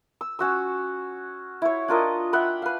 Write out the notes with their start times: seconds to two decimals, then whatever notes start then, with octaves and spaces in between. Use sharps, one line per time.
0.21 E6
0.39 C#4 F#4 E6
1.62 E4 C#5
1.88 D4 F4 A#4 D#5
2.33 E5 F#5 G5 B5
2.62 B4 F5